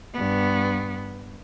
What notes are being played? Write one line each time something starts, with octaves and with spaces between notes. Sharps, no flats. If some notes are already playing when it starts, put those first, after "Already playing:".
G2 B3